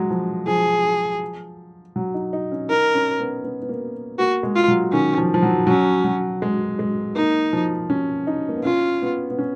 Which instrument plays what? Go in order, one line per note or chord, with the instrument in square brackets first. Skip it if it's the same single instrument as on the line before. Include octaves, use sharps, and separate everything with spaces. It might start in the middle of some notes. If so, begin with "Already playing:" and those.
Already playing: [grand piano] F#3 G#3
F3
[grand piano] F3 [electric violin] G#4
[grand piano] F#3
D#4
D#4
C#4
[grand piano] D#4 [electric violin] A#4
[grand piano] C#4
B3
B3
B3
A#3
[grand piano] A#3 [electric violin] F#4
[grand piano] G#3
[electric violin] F4
[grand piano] F#3
[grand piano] D#3 [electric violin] C#4
[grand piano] F3
F3
F#3
[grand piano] F#3 [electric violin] C#4
[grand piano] F#3
G#3
G#3
[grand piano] A#3 [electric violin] D#4
[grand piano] F3
C#4
D#4
A#3
B3
[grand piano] C#4 [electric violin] F4
[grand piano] B3
B3
C#4